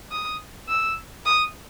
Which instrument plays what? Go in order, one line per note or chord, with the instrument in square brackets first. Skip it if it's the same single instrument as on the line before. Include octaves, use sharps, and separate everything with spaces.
[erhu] D#6
E6
D#6